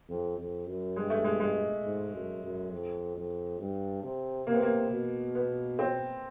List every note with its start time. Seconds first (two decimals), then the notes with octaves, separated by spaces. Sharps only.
0.09 F2
0.38 F2
0.67 F#2
0.96 G2 G#3
1.10 A3
1.24 G#3
1.40 G#3
1.84 G#2
2.13 F#2
2.43 F#2
2.72 F2
3.16 F2
3.60 G2
4.03 C3
4.47 C3 A#3
4.54 B3
4.62 A#3
4.91 B2
5.35 B3
5.79 C4